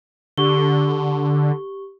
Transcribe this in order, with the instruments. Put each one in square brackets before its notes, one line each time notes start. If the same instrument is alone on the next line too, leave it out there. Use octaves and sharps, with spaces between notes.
[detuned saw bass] D3 [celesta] G4 C#6 G7